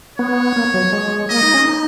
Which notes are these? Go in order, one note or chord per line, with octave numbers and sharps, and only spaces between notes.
B3 C#5
A#3
F#3
G#3
A#3 D#5
D#4
C#4
D#4